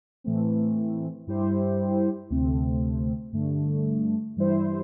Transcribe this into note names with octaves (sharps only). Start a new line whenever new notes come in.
A2 E3 A3 C4
G2 G3 E4 G4 C5
D2 C3 A3 C4
G2 D3 A3
G2 E3 G3 E4 C5